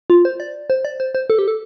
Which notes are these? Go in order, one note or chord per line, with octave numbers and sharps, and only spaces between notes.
F4
C5
D5
C5
D5
C5
C5
A4
G4
A4